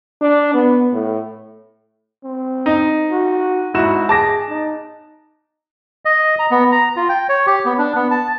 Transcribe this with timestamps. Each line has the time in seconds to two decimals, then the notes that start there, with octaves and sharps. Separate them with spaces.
0.22 D4
0.54 B3
0.93 A2
2.24 C4
2.66 D#4
3.11 F#4
3.74 G#2 E4 F#4 E7
4.09 G#4 A5 D6 A#6
4.49 D#4
6.05 D#5
6.39 A#5
6.51 B3
6.72 A#5
6.96 F4
7.09 G5
7.29 C#5
7.47 G4
7.65 B3
7.78 D4
7.95 B3
8.11 A5